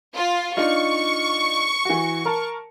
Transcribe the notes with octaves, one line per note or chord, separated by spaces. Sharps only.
F4
D4 D#4 F4 C#6
E3 F#4
A#4 A5